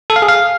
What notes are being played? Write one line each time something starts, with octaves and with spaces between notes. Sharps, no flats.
A4
F5
G#4
F5